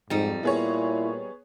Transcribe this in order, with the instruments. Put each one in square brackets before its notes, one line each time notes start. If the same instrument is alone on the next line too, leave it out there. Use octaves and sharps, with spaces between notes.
[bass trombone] F2 [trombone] G#2 [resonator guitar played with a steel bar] G3 D#4
[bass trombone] A#2 [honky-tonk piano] B3 G#4 C#5 [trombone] E4